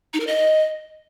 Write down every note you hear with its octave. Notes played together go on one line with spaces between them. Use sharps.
D#4
A#4
D#5